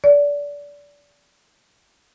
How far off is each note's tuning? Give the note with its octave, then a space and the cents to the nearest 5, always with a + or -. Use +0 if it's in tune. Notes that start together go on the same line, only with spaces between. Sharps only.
D5 -25